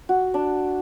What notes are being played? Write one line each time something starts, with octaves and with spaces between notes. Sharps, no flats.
F#4
D4